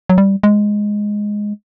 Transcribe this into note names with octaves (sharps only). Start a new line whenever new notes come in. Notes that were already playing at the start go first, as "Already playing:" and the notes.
F#3
G3
G#3